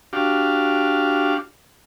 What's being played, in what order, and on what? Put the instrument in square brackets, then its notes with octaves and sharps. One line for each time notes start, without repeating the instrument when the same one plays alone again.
[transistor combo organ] D4 F#4 G4 F5